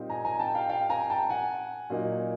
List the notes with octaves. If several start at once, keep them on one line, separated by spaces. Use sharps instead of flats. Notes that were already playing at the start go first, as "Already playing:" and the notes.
Already playing: A#2 G3 C4 D#4
G#5 A#5
G#5 A#5
G5 A5
F5 G5
F5 G5
G#5 A#5
G5 A5
F#5 G#5
A#2 F#3 A#3 D#4